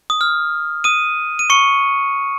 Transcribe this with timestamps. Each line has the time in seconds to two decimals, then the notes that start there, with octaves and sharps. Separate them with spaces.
0.10 D#6
0.21 F6
0.84 D#6 D#7
1.39 D#7
1.50 C#6 C#7